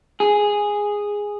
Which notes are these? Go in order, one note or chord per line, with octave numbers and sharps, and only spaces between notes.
G#4